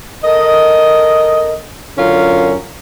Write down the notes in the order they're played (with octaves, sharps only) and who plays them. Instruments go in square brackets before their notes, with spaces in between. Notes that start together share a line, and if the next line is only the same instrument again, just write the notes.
[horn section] A4 A#4 D#5
F#2 D3 C#4 F4 A#4